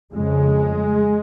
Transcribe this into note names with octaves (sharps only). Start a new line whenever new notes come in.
F2 C#3 G#3